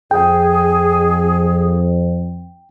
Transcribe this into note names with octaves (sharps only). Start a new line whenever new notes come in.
F2 G#4 G5